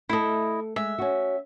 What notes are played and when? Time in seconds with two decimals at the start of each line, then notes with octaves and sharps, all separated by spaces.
0.09 A3 E4 A4 D#5
0.76 G#3 E5
0.98 C#4 F#4